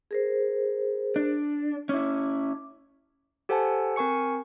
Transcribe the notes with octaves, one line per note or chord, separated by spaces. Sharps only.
G#4 A#4 C5
D4
C#4 E4 D6
G4 A4 C5 F#5 G#5 A5
C4 A#4 G#5 C#6 C#7